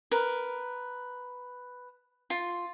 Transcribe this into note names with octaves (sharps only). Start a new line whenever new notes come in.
A#4 B4
F4